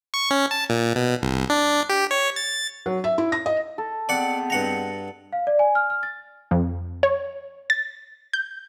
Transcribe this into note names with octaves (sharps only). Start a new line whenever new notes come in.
C#6
C#4
A5
A#2
B2
C2
D4
G4
C#5
A6
F#3
E5
E4
A#6
D#5
A4
G#3 B3 C4 D5 F#5
G2 F#5 A#5
F5
D5
G#5
F6
F6
A6
F2
C#5
A6
G6